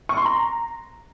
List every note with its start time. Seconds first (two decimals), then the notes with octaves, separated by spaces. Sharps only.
0.09 C#6
0.17 C6
0.25 A#5